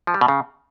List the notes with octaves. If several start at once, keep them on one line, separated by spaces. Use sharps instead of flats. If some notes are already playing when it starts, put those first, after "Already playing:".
F3
G3
B2
C#3